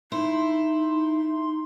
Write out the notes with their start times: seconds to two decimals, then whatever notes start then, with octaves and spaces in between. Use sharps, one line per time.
0.12 D#4 E4 C6